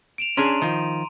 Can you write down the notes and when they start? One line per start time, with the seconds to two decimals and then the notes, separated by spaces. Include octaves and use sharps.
0.18 D7 E7 F7
0.37 C#4 D4 G#4 A#5 C6 D#7
0.62 D#3 F3